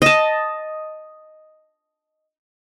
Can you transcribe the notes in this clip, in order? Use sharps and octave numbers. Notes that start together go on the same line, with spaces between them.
D#5 A5